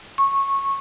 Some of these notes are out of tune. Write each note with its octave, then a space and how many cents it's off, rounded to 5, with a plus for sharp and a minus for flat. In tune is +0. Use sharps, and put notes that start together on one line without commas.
C#6 -15